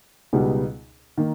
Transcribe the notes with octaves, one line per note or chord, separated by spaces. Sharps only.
C#2 B2 G3 B3 D#4
D#3 A#3